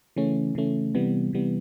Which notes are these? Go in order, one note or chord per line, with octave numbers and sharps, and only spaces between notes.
C#3 E3 A3 C#4
C#3 E3 A3 C#4
C3 E3 G3 B3
C3 E3 G3 B3